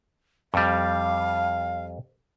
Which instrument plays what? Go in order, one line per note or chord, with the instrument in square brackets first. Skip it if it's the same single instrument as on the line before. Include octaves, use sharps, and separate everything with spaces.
[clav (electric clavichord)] F2 G3 [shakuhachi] F5